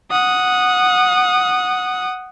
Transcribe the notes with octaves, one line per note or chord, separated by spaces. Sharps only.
F#5 D#6